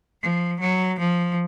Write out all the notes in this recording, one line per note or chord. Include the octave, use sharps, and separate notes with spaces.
F3
F#3
F3